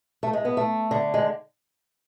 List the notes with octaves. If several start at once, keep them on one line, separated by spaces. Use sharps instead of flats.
A3
G#3
B3
A3
D3
G#3